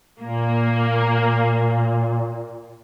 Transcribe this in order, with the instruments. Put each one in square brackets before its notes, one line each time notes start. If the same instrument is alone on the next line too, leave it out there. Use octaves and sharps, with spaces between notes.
[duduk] A#2 [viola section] A#3